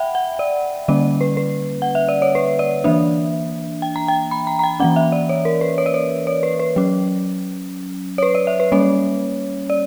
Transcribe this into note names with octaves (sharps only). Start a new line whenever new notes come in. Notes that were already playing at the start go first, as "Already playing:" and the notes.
Already playing: E5 F#5 G5 B5
F#5
D5
D3 G3 A#3 C#4 D5
B4
B4
F#5
E5
D5
C#5
B4
D5
E3 A#3 D4 E5
G5
A#5
G5
B5
A#5
A#5
G5
E3 A#3 C#4 F#5
E5
D5
C#5
A#4
B4
C#5
D5
C#5
C#5
B4
B4
F#3 C#4
C#5
B4
D5
E5
B4
G3 A#3 C#4 C#5
D5